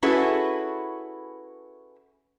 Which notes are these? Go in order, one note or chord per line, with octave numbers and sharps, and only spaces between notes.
C#4 E4 F#4 G#4 A4 B4